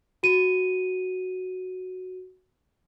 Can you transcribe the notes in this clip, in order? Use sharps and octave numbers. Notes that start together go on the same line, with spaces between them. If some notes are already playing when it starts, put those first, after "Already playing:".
F#4 D#7